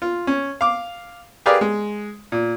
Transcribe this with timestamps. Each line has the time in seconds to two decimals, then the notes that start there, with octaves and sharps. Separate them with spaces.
0.02 F4
0.27 C#4
0.61 F5 D6
1.46 G4 G#4 A#4 B4 D5 F5
1.61 G#3
2.32 A#2